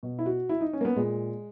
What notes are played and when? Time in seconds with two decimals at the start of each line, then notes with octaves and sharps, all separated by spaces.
0.03 B2
0.19 E4
0.26 F#4
0.49 E4
0.61 D#4
0.73 C#4
0.81 A#3
0.85 B3
0.96 A#2 G#3